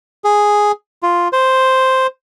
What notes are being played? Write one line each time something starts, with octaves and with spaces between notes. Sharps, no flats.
G#4
F4
C5